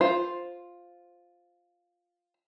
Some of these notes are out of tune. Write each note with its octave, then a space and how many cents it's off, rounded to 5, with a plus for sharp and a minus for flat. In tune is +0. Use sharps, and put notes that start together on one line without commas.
F4 +5 C5 +5